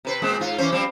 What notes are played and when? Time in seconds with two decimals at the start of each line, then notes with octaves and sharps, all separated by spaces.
0.05 C3 B4 C5
0.22 A#2 G#3 C4
0.40 G#2 F4
0.58 E3 C#4 C5
0.72 F3 G3 C4